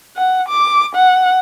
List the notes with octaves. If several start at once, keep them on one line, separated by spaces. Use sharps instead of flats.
F#5
D6
F#5